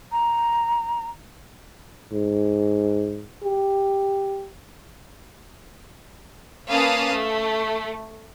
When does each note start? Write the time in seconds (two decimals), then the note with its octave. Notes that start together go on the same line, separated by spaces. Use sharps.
0.11 A#5
2.12 G#2
3.44 G4
6.68 A#3 C#4 B4 F5 A5 D#6
7.13 A3